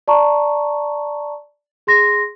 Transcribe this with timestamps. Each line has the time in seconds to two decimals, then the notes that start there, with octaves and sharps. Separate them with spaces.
0.08 D5 A5 A#5 C#6
1.87 G#4 C6 A#6